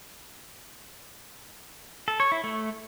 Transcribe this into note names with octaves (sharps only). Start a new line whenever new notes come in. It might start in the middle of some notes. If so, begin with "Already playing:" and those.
A4
C#5
E4
A3